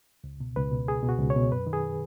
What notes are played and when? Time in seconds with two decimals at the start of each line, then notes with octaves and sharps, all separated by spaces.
0.24 C#2
0.40 B2
0.56 C#2 B4
0.71 B2
0.88 C#2 G#4
1.03 B2
1.09 F#4
1.19 C#2
1.30 C#5
1.36 B2
1.52 F#2 B4
1.67 D#3
1.73 G#4